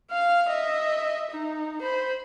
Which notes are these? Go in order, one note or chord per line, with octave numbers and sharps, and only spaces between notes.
F5 F6
D#5 E5
D#4
C5 B5